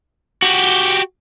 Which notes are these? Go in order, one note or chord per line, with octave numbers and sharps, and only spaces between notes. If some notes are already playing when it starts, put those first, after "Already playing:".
F#4 G4